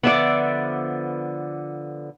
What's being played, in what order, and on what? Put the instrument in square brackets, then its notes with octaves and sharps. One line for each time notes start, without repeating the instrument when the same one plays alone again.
[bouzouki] D3 F3 B3 [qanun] D5 E5 F#5